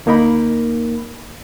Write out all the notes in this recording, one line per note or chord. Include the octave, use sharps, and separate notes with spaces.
D2 A#3 D#4 A#4 B5